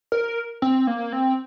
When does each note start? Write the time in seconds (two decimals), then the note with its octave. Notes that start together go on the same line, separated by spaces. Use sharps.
0.12 A#4
0.62 C4
0.87 A#3
1.12 C4